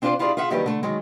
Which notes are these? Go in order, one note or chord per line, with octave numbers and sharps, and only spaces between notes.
C4 D4 F4 A#4 C5 D5
E4 F4 G4 G#4 D5
F4 G#4 E5 F#5
D#2 D#3 F#3 G3 G4 B4
D3 A3
D#3 F#3 G#3